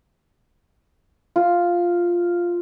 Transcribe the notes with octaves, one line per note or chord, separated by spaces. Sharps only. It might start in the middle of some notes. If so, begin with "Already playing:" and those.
F4